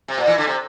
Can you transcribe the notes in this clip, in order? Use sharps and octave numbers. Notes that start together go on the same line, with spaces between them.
C3
A#2
E3
D3
C3